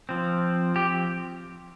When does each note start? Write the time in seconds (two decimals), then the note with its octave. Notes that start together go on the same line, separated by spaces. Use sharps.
0.09 F3 C4
0.76 G4